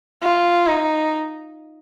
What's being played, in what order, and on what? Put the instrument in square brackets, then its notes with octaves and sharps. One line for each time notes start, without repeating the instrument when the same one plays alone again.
[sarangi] F4
D#4